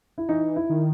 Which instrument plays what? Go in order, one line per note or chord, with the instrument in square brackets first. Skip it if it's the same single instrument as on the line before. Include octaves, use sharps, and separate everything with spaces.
[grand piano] E4
[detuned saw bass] E3 [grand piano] D#4
[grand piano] E4
[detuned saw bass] D#3